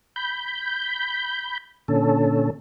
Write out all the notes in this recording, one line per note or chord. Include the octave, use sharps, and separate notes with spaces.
B5 G6
A#2 D3 C#4 A4